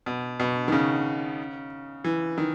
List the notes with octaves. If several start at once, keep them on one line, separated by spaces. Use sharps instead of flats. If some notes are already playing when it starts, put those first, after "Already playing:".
B2
B2
D#3
C#3
E3
D#3